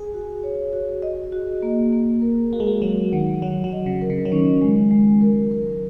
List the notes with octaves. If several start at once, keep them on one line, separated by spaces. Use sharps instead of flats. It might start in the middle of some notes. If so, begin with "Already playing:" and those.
Already playing: G#4
F#4
C#5
F#4
D#5
F#4
A#3
A#3
A#4
A#3 F#4
G#3
A#3
F#3 F#4
D#3 F#5
F#3 F#4
F#3
D#5
C#3
A#4
C#3
F#3
D#3 C#4
G#3
G#3
A#4
A#4